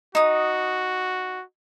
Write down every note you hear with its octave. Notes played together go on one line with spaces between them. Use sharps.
D#4 F#4 D#6